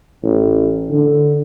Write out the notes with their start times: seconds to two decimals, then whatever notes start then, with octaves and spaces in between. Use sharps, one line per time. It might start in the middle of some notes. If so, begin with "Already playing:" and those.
0.23 A1
0.90 D3